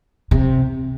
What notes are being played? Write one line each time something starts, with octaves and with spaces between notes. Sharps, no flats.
C3